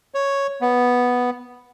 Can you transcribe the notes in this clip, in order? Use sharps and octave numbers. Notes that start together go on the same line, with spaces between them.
C#5
B3